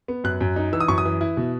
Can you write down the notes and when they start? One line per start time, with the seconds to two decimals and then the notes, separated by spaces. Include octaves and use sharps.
0.08 B3
0.24 F#2 F#6
0.41 F#2
0.56 D#4
0.73 E3 E6
0.80 D#6
0.88 F#2 C#6
0.98 D#6
1.05 E3
1.21 E4
1.37 B2